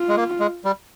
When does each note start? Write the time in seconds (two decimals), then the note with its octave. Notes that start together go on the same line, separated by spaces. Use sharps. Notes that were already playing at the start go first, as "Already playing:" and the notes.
Already playing: F4
0.09 G#3
0.17 A#3
0.40 G#3
0.65 G3